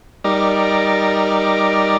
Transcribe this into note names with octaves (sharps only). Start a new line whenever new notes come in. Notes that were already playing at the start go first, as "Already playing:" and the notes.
G3 D#4 A#4 D5